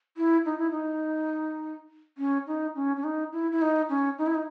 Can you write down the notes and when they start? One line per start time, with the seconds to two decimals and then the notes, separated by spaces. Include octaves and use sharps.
0.17 E4
0.45 D#4
0.58 E4
0.71 D#4
2.18 C#4
2.47 D#4
2.75 C#4
2.96 C#4
3.04 D#4
3.32 E4
3.51 E4
3.62 D#4
3.89 C#4
4.18 D#4
4.26 E4
4.34 D#4